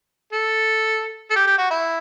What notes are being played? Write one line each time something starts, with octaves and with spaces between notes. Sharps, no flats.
A4
A4
G4
G4
F#4
E4